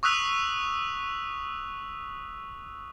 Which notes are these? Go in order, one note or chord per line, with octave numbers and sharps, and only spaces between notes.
C#6 D#6 E6 F#6 B6 F7